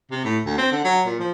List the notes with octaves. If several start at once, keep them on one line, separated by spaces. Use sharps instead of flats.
C3
A2
D2
C4
D3
F#3
A#2
F3